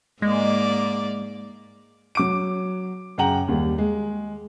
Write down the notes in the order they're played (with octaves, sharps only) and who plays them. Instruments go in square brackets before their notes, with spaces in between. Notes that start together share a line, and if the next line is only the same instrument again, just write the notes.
[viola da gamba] G#2 A#3 D5 [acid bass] G#3
[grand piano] F#3 D6 D7
F#2 C#3 F#5 G5 A#5 F#7
D#2 G3
G#3